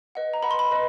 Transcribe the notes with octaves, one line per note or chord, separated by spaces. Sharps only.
B4 D#5 F#5
A#5
B4 D#5 F#5 B5
C6
B5
B4 D#5